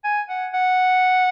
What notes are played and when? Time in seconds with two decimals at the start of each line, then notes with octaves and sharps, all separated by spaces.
0.04 G#5
0.29 F#5
0.54 F#5